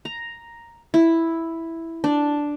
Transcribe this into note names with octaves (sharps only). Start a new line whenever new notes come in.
A#5
E4
D4